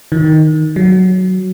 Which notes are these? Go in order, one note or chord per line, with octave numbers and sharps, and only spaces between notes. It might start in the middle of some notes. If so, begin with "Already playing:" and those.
D#3
F#3